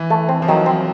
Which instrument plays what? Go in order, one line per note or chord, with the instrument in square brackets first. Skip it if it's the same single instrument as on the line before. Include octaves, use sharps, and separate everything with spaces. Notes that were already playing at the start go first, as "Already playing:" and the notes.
Already playing: [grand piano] E3
[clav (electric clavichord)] A3
C4
[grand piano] F3
[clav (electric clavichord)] D#3 [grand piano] F#3
[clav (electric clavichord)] C4